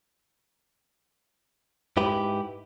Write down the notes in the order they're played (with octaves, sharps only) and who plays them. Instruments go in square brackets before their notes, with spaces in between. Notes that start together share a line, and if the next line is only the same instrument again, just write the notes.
[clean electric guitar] G#2 E4 G4 B4